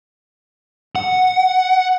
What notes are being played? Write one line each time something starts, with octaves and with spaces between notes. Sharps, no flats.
F#5